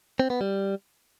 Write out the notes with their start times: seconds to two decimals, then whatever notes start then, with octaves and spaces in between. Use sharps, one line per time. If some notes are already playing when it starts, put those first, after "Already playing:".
0.20 C4
0.30 B3
0.41 G3